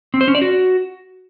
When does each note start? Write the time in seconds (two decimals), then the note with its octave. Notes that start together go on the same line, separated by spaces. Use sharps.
0.14 C4
0.21 C5
0.28 C#4
0.35 D5
0.42 F#4